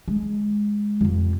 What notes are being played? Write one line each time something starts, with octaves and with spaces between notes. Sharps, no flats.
G#3
F2 C3